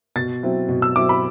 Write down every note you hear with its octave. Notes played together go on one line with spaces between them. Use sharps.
B2 A6
F#3 C4 E4
B2
E6
F#3 C4 E4 D6
B5